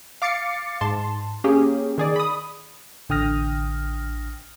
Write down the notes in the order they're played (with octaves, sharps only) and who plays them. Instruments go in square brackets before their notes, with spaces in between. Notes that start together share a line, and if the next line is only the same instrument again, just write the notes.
[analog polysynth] F5 D6 A6 C7 C#7
G#2 A5 C6
A#3 C#4 G4 G#4
D#3 G#4 D5
B5 D#6
[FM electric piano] A1 D3 G5 D#6 F6 A#6